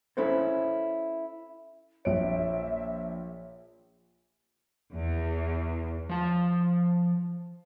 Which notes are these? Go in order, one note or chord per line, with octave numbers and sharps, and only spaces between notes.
C#4 E4 A4 C5 C#5
A#1 C#5 E5 D7
E2
F3 A5